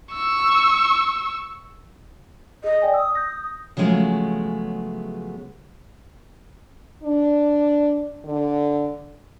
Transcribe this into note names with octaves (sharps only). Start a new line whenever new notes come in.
C#6 E6
G#4 D#5
D5 G5 G#5
D#6 E6
G6 A#6
C#3 F3 F#3 G#3 A3 B3
D4
D3